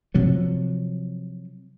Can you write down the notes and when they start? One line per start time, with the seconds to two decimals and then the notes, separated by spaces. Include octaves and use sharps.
0.14 C3 F3 F#3